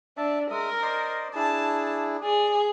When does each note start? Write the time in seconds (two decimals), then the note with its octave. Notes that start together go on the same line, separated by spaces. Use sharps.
0.17 D4 E5 A5
0.51 G#3 A#4 E5 D#6
0.82 C5 D5 D#5
1.35 D4 E4 G#4 A5
2.24 G#4 D5